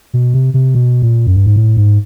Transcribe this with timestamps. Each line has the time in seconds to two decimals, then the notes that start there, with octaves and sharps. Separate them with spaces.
0.14 B2
0.34 C3
0.54 C3
0.75 B2
1.02 A#2
1.27 F#2
1.36 G2
1.46 G#2
1.56 A2
1.77 G#2